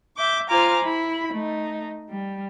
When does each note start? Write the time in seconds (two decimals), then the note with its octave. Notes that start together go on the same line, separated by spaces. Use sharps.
0.17 E5 D6 G6
0.49 F4 C5 G#5 A#5 D6 F6
0.82 E4 B5
1.32 A3 D#4
2.08 G3